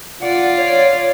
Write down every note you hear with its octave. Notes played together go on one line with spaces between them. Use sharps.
F4 D5 F#5
C#5